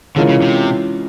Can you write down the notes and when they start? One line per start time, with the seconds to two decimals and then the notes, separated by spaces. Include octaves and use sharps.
0.16 D3 E3 G#3 C#4 F4 A#4
0.29 C#3
0.42 C3